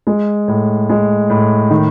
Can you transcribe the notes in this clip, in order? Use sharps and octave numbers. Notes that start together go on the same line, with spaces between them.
G#3
A2
G#3
A2
D#3